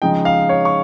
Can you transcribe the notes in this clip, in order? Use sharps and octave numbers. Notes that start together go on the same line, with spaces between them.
C#3 F3 G#3 D#4 G5
F5
C#5
C#6